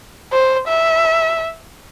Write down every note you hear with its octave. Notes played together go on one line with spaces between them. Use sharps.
C5
E5